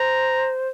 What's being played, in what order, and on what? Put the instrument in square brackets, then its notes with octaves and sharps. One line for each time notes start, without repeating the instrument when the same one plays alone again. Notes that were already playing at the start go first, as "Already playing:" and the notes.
Already playing: [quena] C5 [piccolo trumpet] A#5